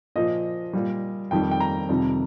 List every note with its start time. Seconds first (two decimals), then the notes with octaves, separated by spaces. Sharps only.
0.16 A#2 F3 D#5
0.73 A#2 G3
1.31 F2 D#3 G3 G5
1.51 G5
1.60 A#5
1.89 F2 C3 D#3 G3